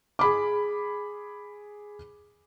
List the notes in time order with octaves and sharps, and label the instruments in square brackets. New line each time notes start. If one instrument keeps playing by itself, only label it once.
[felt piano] G#4 B5 D6